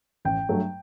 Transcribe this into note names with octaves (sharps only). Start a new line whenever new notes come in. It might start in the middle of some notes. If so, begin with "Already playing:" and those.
A1 G5
G2 F#3 A3